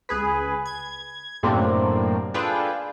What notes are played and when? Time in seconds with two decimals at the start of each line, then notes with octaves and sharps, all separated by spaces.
0.09 C#2 G#4 B4
0.66 G#6
1.43 F#2 A2 C3 A#3 C4 D4
2.34 D4 F4 G#4 A4 B4 G5